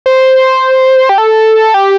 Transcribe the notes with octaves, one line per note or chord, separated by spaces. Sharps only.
C5
G4
A4
G4